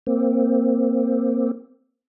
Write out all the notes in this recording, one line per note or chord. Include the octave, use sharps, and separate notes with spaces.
A#3 C4